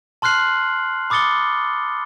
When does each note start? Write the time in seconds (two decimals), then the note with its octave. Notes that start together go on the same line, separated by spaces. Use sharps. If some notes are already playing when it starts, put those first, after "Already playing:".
0.22 A5 C6 F6 F#6 C7 F#7
1.10 B5 D6 D#6 A6 C#7 G7